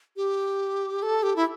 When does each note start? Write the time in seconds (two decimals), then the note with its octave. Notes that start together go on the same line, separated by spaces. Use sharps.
0.16 G4
1.03 A4
1.23 G4
1.36 E4